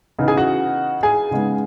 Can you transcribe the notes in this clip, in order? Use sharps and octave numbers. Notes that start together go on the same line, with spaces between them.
C#3 E3 B3 D#4
G#4 G#5
F#4 F#5
G#4 G#5
C#3 G#3 B3 D#4